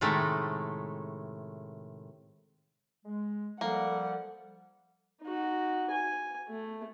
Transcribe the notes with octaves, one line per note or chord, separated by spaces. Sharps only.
A2 C3 D#3 G#3 A3
G#3
F3 G3 A#3 A4 F#5
D#4 F#4
G#5
A3